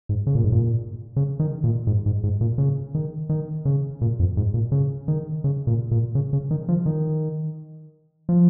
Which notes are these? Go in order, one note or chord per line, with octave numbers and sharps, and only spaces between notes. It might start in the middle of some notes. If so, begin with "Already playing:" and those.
G#2
C#3
A#2
G#2
A#2
C#3
D#3
A#2
G#2
G#2
G#2
A#2
C#3
D#3
D#3
C#3
A#2
F2
G#2
A#2
C#3
D#3
C#3
A#2
A#2
C#3
C#3
D#3
F3
D#3
F3